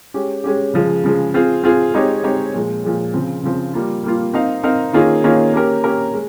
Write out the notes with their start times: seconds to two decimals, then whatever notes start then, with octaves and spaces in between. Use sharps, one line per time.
0.14 G#3 C#4 G4
0.44 G#3 C#4 G4
0.74 C#3 F3 G#3
1.04 C#3 F3 G#3
1.34 C4 F4 G#4
1.64 C4 F4 G#4
1.94 G#3 C4 D#4 G4 C#5
2.24 G#3 C4 D#4 G4 C#5
2.54 A#2 F3 G#3
2.84 A#2 F3 G#3
3.14 C#3 F3 C4
3.43 C#3 F3 C4
3.74 G3 A#3 F4
4.04 G3 A#3 F4
4.34 C4 D#4 A#4 F5
4.63 C4 D#4 A#4 F5
4.93 D#3 A#3 C#4 F4 G#4
5.24 D#3 A#3 C#4 F4 G#4
5.54 A#3 C#4 G4 A#4
5.84 A#3 C#4 G4 A#4
6.13 G#3